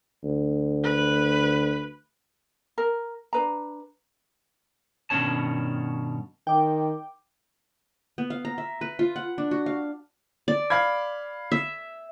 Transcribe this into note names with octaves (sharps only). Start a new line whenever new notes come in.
D2
B4
A#4
D4 B4 A#5
G2 B2 D#3 C#4 C#5 A5
D#3 G5 D6
B3
F5
A#5
E5
B4
F4
F#5
D4
F#4
F5
D5
F5 B5 G#6
E5